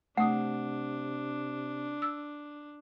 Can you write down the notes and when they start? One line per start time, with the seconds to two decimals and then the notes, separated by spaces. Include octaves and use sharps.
0.17 C3 A3 D4 F#5 D#6
2.02 E6